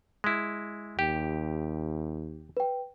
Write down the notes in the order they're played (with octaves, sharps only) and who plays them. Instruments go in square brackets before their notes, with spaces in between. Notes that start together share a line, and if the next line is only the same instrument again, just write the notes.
[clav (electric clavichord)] G#3 E4
[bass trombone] D#2 [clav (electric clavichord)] G4 [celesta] G5
[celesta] B4 G5